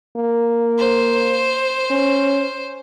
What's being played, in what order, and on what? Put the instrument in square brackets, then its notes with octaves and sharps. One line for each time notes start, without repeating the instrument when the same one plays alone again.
[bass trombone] A#3
[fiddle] C5
[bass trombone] C#4